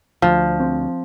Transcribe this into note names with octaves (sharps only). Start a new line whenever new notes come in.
D2 F3
C4